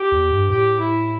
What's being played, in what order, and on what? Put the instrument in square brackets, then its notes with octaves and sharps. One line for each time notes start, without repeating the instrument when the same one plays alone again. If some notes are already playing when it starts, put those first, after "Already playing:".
Already playing: [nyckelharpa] G4
[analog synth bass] E2
G2
[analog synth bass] A2 [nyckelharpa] G4
[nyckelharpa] E4